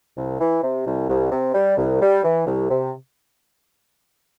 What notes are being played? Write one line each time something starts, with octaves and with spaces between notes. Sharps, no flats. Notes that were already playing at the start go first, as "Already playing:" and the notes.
C2
E3
C3
C2
C2
C3
G3
C2
G3
E3
C2
C3